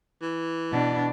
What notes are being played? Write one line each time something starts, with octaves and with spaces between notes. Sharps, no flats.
E3
B2 D4